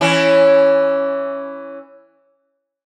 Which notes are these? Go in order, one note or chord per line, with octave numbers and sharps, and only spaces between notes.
E3 C#4